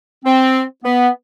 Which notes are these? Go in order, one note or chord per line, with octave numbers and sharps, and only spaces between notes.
C4
B3